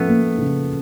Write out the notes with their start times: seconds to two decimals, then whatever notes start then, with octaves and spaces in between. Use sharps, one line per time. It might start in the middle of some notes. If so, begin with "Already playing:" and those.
Already playing: F3 A3 B3 C#4
0.08 A#3
0.38 C#3